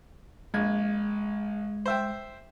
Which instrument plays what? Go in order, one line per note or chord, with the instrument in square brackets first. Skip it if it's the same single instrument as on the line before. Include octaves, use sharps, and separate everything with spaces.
[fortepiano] A#1 [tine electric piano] G#3 G#6
[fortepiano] C5 E5 G5